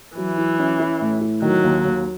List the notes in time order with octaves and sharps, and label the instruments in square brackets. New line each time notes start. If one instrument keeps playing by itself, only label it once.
[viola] E3 [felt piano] F#3
[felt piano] E4
C#4
E4
A2
E4
[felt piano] D#3 [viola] F#3
[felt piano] D#2
D#2